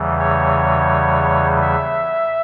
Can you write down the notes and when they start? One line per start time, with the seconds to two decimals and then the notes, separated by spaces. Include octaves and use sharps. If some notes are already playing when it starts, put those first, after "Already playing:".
Already playing: E2 C#3 E3 G3
0.19 C#5
1.62 E5